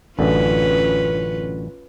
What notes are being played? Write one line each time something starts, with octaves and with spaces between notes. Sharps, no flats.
A1 F#2 D3 C#4 F4 B4